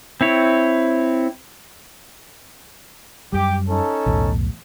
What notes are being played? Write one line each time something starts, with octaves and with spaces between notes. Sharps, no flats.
C4 E4 C#5
F#2 G3 G4 D6
C#4 D#4 A4
B1 E2 A2